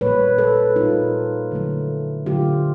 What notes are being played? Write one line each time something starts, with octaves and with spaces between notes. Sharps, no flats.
A#2 G3 A#3 B4 C#5
A4 B4
A#2 G3 A#3 D#4 F4
D3 F#3 A3
D3 F#3 A3 F4 G4